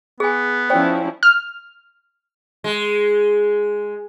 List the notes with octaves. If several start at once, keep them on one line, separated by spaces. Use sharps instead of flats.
B3 G#4 G#5
F3 C#4 E4 C5 D5 G5
F6
G#3